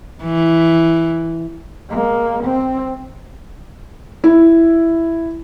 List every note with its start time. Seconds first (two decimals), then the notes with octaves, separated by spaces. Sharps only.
0.23 E3
1.89 G#3 A#3
2.44 C4
4.24 E4